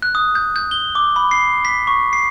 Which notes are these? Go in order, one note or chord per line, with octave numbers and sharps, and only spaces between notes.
F#6
D#6
G6
G6
G7
D6
B5
C7
B6
C#6
C7